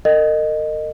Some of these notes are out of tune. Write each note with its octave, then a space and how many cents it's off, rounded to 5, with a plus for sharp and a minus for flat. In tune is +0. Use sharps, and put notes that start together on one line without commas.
A#4 -40 D#5 -15